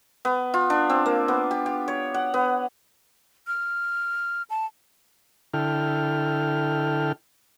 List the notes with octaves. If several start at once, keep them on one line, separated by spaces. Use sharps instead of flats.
B3
F4
D4
C4
A#3
B3
G4
G4
C#5
F#5
B3
F6
A5
D3 E4 A4 G5 F6